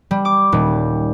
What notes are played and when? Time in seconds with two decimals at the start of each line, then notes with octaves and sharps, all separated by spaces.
0.11 G3
0.25 D6
0.52 D#1